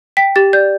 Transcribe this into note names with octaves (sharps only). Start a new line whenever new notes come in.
G5 B6
G4 A6
D5 G6